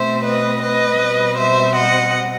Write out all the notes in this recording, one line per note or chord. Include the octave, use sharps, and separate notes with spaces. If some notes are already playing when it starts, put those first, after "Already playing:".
Already playing: B2 A3 C4 C5 E5
B4 D#5
B4 D#5
B2 G3 C4
C5 E5
D#5 F#5